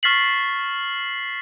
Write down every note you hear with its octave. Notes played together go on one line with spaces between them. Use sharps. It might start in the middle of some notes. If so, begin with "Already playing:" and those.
C#6 F6 A6 B6 C7 F#7